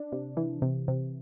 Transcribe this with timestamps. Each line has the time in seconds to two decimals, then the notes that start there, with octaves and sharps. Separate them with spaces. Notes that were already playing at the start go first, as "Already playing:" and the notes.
Already playing: D4
0.12 C3
0.37 E3
0.62 C3
0.88 C3